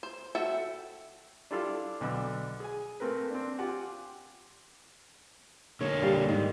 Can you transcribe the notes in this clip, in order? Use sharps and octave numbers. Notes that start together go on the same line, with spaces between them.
C5
F#4 A4 E5 G5
D4 E4 F4 G4 A4 F5
B1 D3 B5 E6
G#4 G#5
A3 A#3 C4 A#4 B4
C4 D4
F4 G4 F#5 G#5
D3 A#3 C#5
G3 F5
G#2 D#3